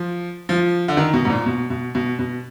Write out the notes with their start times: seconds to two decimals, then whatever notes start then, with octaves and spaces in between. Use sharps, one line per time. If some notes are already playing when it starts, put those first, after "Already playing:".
Already playing: F3
0.49 F3
0.88 D3
0.97 D#3
1.13 B2
1.25 G#2
1.30 A#2
1.46 B2
1.70 B2
1.95 B2
2.19 B2